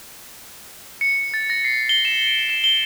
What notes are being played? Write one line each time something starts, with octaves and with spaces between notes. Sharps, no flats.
C#7
A6
A#6
C7
G7
E7
D7
E7
G7